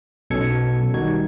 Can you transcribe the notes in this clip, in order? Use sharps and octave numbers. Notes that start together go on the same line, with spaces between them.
B1 B2 C#4 A4 G#6 C#7
D#3 G3 D#4 F#4 G#6